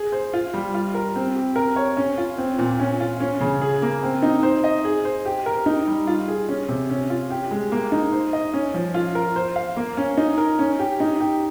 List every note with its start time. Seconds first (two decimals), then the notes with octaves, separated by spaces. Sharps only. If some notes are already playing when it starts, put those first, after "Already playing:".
Already playing: G#4
0.12 C5
0.33 F4
0.54 G3
0.74 F4
0.94 A#4
1.16 C4
1.35 G4
1.56 A#4
1.76 C#5
1.97 C#4
2.18 F4
2.38 C4
2.58 A#2
2.80 C#4
3.00 F4
3.20 C#4
3.41 C#3
3.61 G#4
3.82 A#3
4.03 C4
4.22 D#4
4.43 C5
4.64 D#5
4.84 G#4
5.05 C5
5.25 G4
5.46 A#4
5.66 D#4
5.87 G3
6.07 F4
6.28 G#4
6.49 C#4
6.68 C3
6.90 C#4
7.10 F4
7.30 G4
7.51 G#3
7.72 A#3
7.92 D#4
8.13 C5
8.33 D#5
8.53 C#4
8.74 F3
8.94 F4
9.15 A#4
9.36 C5
9.56 F5
9.77 A#3
9.97 C#4
10.17 D#4
10.38 A#4
10.59 C#4
10.79 G4
11.00 D#4
11.20 G4